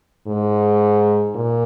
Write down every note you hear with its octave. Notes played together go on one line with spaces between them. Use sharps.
G#2
A#2